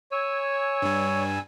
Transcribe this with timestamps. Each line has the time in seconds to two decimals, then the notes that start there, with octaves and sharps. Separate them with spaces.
0.11 C#5 G#5 E6
0.82 G2 G3